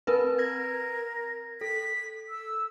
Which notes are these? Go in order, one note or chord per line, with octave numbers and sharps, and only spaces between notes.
C4 A#4 B4
A#4 G#6 A#6
A4 B6
E6